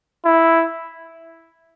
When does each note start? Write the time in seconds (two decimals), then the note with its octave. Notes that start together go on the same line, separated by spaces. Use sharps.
0.25 E4